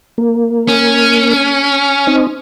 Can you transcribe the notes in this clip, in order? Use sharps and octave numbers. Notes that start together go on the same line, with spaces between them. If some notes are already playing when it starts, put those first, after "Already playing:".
A#3
C#4
C4 D#4